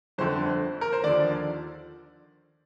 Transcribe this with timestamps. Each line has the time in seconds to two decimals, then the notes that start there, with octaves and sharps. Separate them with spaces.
0.18 G1 F2 D3 C5
0.81 A#4
0.93 C5
1.03 D#2 D3 F3 D5